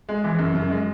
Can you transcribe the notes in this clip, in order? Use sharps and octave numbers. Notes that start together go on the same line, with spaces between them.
G#3
E3
F#2
F#2
G#3